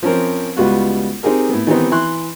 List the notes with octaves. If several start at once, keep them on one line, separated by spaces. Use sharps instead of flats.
F3 C4 C#4 A#4
C#2 G3 B3 F4 F#4 F#5
C4 D#4 G4 G#4 A#4
A2 B3
D#3 E3 G3 B3 C4 D#4
E3 E4 C6 F#6